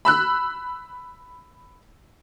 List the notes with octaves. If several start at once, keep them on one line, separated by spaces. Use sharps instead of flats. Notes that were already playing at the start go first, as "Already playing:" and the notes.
B5 E6 F#6